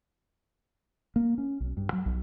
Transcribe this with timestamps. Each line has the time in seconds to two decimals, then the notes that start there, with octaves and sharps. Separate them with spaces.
1.16 A#3
1.38 C#4
1.60 B1
1.77 G2
1.93 F#3
2.06 B1